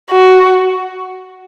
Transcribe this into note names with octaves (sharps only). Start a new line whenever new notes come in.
F#4